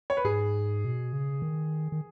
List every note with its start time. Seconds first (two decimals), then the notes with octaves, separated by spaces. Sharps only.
0.10 C#5
0.17 B4
0.24 G#2 G#4
0.84 B2
1.13 C#3
1.42 D#3
1.92 D#3